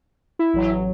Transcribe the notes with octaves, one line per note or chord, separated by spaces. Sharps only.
E4
A1 F#3